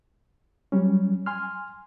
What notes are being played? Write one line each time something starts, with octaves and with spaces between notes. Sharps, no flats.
F#3 G3 C#4
G#5 C6 F6